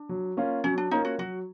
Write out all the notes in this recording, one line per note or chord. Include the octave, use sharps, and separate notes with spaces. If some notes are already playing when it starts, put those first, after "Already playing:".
Already playing: D4
F#3
A#3 C#4 F4
F#3 C#4
D4
A#3 C#4 D#4 F4
F#4
F#3 F#4